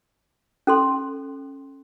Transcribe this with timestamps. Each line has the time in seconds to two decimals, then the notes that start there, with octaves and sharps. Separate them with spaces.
0.67 C#4 A4 C6